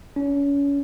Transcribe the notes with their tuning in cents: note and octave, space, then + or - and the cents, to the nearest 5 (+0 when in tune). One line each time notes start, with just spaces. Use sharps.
C#4 +30